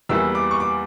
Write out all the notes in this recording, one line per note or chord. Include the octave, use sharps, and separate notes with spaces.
E2 E3 G3 A#3 E6
D6
C#6
D6